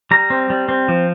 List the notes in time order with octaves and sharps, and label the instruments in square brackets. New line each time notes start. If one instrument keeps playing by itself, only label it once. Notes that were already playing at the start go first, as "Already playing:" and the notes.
[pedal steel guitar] G3 A#5
C4
G3
C4
F3